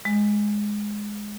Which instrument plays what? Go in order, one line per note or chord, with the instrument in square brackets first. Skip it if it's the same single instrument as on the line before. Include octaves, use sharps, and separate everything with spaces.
[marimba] G#3